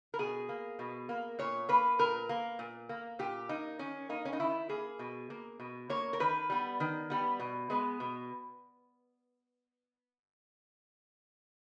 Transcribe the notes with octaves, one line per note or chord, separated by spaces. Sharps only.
A#4
B2 G#4
A#3
B2
A#3
A#2 C#5
A#3 B4
A#2 A#4
A#3
A#2
A#3
A#2 G4
A#3 D#4
D#3 C#4
A#3 D#4
C#4
D#4
D#3 E4
A#3 G#4
B2
A#3
B2
A#3 C#5
A#4
D#3 B4
G3 B3
D#3
G3 B3
B2
G#3 B3
B2